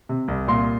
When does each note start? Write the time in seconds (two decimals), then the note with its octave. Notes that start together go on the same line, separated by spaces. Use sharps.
0.09 C3
0.28 C2
0.48 A#2 C6